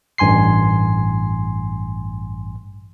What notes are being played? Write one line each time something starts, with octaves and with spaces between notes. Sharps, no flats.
A1 G2 G#5 C6 C7